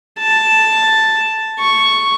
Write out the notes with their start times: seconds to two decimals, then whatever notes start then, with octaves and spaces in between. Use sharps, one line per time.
0.20 A5
1.60 C#6